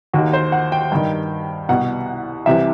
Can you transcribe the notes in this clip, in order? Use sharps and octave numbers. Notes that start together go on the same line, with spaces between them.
D#2 D#3 F#4
C5
F#5
G5
G2 D#3
C2 B2 F#5
C2 C3 E3 E5